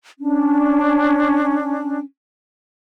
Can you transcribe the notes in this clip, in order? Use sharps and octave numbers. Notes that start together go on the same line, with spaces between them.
C#4 D4